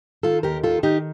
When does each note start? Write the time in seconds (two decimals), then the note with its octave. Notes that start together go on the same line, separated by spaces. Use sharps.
0.23 D#3 F4 A4
0.43 D#2 G4 A#4
0.64 D#3 F4 A4
0.83 D#3 D#4 G4